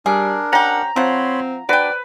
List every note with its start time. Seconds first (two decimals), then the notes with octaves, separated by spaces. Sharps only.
0.06 G3 D4 G#4 A#4
0.53 C#4 G4 F#5 A#5
0.96 F3 C4 C#5 F#5 B5 C6
1.69 D4 F#4 B4 D5 G5